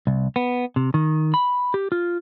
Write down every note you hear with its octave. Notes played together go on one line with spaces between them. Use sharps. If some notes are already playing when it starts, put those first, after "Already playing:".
C2
B3
C3
D#3
B5
G4
F4